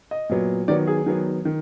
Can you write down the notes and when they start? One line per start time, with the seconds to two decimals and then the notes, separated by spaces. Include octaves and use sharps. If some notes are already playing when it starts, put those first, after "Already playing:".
0.11 D#5
0.29 A#2 F#3 B3
0.68 D#3 F#3 B3 D5
0.87 G#4
1.06 D#3 F#3 B3
1.45 D#3